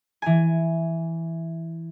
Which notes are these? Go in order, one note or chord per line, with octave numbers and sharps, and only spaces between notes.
E3 G#5